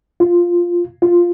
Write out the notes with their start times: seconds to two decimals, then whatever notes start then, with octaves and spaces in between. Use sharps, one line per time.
0.20 F4
1.02 F4